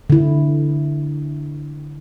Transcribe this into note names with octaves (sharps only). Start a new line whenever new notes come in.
D3 E4